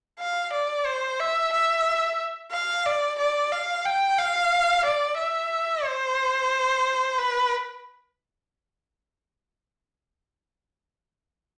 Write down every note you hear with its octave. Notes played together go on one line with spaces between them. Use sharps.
F5
D5
C5
E5
E5
F5
D5
D5
F5
G5
F5
D5
E5
C5
B4